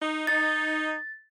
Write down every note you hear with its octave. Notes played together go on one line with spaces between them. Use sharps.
D#4
D#4 A6